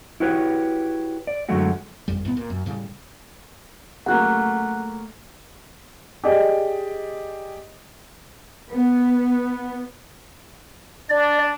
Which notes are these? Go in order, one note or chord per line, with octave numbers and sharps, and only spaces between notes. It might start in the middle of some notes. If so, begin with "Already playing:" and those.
E4 F#4 G4 B4 C#5
D5
F#2 D3 F#3 G#3 A3 F#4
G1 F2 G3
C#2 A2 B3
A#2
F#2
A2 C#3 G3
C#3 F#3 A3 A#3 F#5 F#6
G4 G#4 D5 D#5
B3
D4 D5